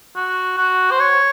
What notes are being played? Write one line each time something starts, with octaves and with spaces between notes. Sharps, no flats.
F#4
F#4
C5
C#5